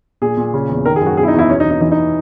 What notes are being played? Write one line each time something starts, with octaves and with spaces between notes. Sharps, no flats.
A#2 G#4
A#2
C#3
E2
D#3 A#4
G#4
F#2
F#4
B2 G#4
E4
D#4
E2
E4
B2 C#4
D#4
E2
D#4
E3 D#4
D#4